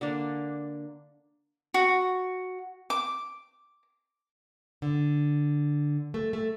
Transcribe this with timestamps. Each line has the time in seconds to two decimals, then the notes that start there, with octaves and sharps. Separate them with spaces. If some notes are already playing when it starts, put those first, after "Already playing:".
0.01 D3 A#3 D4
1.74 F#4
2.90 D6
4.82 D3
6.14 A3
6.33 A3